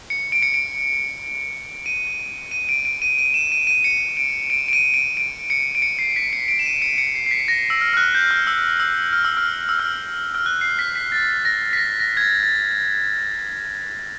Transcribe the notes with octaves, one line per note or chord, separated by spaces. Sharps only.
C#7
D7
C#7
D7
D#7
D#7
D7
D7
D#7
D#7
E7
D#7
D#7
C#7
D7
D7
D7
D#7
D7
D7
C#7
D7
C#7
C7
B6
C#7
D7
E7
D#7
C#7
C#7
C7
C7
B6
A#6
E6
F6
F6
F#6
G6
F6
E6
E6
F6
E6
F6
E6
F6
F6
F#6
C7
B6
B6
A6
A#6
B6
A#6
A#6
G#6
A6
A6